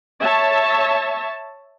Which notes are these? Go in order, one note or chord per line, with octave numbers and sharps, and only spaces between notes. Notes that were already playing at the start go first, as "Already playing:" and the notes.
C#5 E5 A5